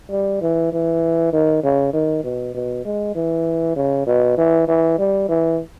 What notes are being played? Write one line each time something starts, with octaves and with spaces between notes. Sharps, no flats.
G3
E3
E3
D#3
C#3
D#3
B2
B2
G#3
E3
C#3
B2
E3
E3
G3
E3